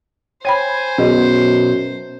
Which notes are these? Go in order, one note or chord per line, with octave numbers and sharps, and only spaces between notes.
C5 C#5 G5 G#5 B5
F#2 B2 G#4 D#5